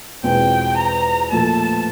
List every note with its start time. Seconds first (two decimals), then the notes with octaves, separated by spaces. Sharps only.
0.23 E2 B2 G#3 C4 F4 G5
0.77 A#5
1.31 A#2 F3 A3 A5